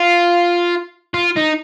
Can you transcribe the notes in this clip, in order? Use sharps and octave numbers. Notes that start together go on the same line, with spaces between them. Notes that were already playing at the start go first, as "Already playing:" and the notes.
Already playing: F4
F4
D#4